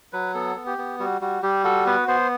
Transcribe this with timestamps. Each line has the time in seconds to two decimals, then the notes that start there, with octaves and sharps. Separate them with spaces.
0.13 F#3 B4
0.34 B3 A4
0.56 B3
0.66 G4
0.78 B3
0.99 G3 F#4
1.21 G3 F#4
1.43 G3 G4
1.64 F#4 A4
1.86 B3 B4
2.08 B3 C5